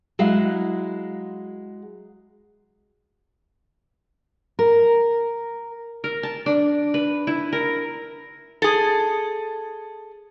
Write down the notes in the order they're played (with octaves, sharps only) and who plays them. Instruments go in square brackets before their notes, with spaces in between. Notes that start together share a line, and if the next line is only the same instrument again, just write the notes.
[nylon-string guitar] F#3 G#3 E4 F5 F#5
[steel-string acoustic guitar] A#4
[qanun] A#4
A5
D4
B4
E4
A#4
[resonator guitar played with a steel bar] G#4 A4